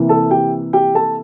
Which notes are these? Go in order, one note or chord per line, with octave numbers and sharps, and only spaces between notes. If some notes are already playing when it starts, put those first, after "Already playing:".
Already playing: C3 E3 A#3 E4
A4 A5
G4 G5
G4 G5
A4 A5